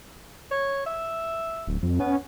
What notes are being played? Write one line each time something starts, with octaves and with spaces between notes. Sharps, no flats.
C#5
E5
D1
F2
B3 C#4